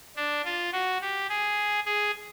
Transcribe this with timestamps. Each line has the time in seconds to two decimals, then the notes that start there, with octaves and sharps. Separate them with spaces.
0.17 D4
0.45 F4
0.73 F#4
1.01 G4
1.29 G#4
1.86 G#4